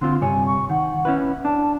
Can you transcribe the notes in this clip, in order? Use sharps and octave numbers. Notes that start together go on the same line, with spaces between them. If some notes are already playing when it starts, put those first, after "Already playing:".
D3 C4 F4 C6
G2 C3 C#5 G#5
C#6
D#3 F#5
C#4 E4 B4
D4 A5